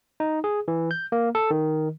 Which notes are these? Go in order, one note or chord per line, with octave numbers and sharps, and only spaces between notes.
D#4
G#4
E3
G6
A#3
A4
D#3